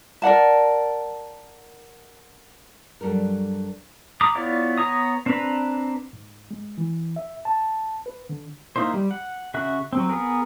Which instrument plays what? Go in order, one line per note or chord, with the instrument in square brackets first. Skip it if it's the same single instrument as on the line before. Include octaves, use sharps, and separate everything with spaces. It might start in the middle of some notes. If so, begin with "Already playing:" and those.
[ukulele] A#4 D5 F#5 A5
[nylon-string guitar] G2 F#3 G3 A4 A#4
[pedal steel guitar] A#5 B5 D6 D#6
B3 E4 F4 C#5 D5
B3 C#5 A#5 D#6
C4 D4 B4 A#5 B5
[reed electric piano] G#2
G#3
E3
E5
A5
B4
D3
[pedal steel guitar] A#3 D#4 E4 C5
G3
F#5
C#3 F#4 E5 F#6
F#3 C4
B3 G#4 A#4